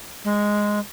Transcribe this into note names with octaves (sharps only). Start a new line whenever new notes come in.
G#3